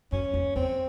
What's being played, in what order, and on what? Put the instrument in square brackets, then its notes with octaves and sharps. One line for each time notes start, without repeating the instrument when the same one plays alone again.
[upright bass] F#2 [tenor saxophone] C#4
[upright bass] F2
[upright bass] E2 [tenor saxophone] C4